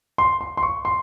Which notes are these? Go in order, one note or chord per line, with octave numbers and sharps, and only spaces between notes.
C6
C6
C6
C#6
C6